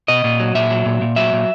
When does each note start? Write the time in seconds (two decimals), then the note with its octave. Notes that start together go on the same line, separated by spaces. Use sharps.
0.08 B2 D#5
0.24 A#2
0.40 F#3
0.55 A#2 E5
0.71 F#3
0.86 A#2
1.01 A#2
1.16 F#3 E5
1.33 A#2